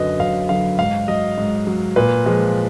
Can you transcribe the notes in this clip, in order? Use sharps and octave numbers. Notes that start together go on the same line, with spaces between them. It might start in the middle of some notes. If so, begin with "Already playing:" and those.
Already playing: F#2 D3 F#3 B4 D#5
F#2 F5
D3 F#3 F5
G#2 F5
F#3 D#5
G#2
F#3
A#2 B4
F3 G#3